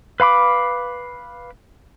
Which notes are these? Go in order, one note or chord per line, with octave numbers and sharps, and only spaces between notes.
B4 F5 B5 D6